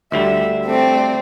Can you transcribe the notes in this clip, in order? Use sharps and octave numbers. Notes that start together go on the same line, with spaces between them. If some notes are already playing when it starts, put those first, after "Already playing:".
D2 D3 G3 E5
A3 C4 D5